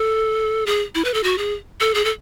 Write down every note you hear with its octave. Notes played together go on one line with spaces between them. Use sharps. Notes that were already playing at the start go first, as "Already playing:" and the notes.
Already playing: A4
G#4
E4
B4
A4
F#4
G#4
A4
G#4
A4